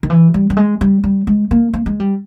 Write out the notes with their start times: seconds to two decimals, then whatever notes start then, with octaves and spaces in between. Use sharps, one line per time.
0.03 D#3
0.10 E3
0.34 G3
0.50 G3
0.57 G#3
0.81 G3
1.04 G3
1.27 G#3
1.51 A#3
1.74 A#3
1.86 G#3
2.00 G3